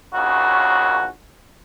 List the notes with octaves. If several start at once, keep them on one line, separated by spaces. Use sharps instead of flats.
A#1 D#2 C#3 C#4 F#4